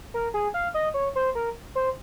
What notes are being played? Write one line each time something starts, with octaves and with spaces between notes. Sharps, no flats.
A#4
G#4
F5
D#5
C#5
C5
A#4
C5